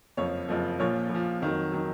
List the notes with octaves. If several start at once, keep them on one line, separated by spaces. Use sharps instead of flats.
F#1 F2 F3 C#5
F#1 F2 F3
A#1 A#2 F3 C#5
A#1 A#2 F3
F2 D#3 F#3
D#3 F#3